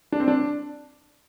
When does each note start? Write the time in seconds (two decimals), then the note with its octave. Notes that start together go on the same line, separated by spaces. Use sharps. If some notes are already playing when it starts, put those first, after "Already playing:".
0.12 D4
0.20 C4
0.28 D4